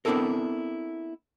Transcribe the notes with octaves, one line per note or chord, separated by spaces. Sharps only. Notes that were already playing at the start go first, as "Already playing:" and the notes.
B3 C4 D4 E4 A4 A#4